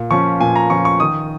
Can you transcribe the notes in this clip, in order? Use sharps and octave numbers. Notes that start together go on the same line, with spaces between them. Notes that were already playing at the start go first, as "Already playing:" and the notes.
Already playing: A#2
F3 C#4 C#6
A#2 G#5
A#5
F3 C#4 C#6
C#6
D#3 D#6